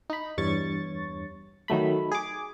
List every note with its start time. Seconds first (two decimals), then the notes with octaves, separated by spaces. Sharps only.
0.10 D#4 B5
0.38 E2 G2 C#5 C#6 A6
1.68 D#3 F#3 A3 B5
2.12 G#4 D6